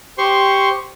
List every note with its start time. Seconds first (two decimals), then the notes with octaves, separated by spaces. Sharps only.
0.18 G4 C5 C6 C#6